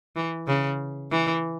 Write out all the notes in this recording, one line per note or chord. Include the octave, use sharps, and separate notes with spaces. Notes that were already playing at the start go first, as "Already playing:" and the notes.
E3
C#3
E3